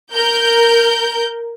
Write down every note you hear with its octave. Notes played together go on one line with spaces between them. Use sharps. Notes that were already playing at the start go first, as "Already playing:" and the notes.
A#4 G6